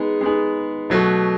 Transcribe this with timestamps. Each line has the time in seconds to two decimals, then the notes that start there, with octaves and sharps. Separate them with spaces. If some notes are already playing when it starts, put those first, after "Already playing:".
Already playing: G#3 B3 D#4 G#4
0.21 G#3 B3 D#4 G#4
0.90 B2 F#3 A3